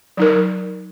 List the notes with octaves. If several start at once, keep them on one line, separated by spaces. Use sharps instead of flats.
F#3 D#4 A#4